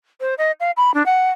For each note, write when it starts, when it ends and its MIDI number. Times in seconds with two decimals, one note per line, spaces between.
0.21 0.34 72
0.38 0.52 75
0.60 0.71 77
0.77 0.94 83
0.94 1.05 62
1.06 1.31 78